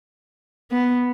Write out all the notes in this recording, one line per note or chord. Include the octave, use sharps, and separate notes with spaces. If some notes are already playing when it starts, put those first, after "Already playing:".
B3